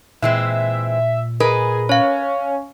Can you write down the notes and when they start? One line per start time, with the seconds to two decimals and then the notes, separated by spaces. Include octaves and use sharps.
0.22 A#2 E3 G#3 C4 E5
1.40 G#4 A#4 B4 D#5
1.89 C#4 C#5 F5